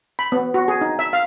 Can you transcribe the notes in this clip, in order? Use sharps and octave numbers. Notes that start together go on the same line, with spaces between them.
B5
B3
F#4
G#4
D#4
E5
F5